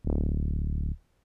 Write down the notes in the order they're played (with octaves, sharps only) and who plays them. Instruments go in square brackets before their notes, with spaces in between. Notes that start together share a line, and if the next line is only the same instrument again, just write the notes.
[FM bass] D1